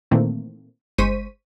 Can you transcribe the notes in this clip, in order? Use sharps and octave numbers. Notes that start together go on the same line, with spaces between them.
A#2 D#3 E3 A3 A#3 C4
G1 G#3 C5 C#6 B6 D#7